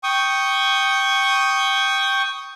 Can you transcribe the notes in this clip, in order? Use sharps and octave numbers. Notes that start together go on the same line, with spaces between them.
G5 C#6 D#6